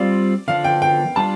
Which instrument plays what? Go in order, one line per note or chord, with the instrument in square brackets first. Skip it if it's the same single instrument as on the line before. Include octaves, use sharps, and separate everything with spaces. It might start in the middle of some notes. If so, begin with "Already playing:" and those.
Already playing: [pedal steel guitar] G3 C4 F4 [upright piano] D5
[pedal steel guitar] D3 F3 D4 [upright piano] F5
[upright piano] G5
G5
[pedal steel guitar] G3 D4 F4 [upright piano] A5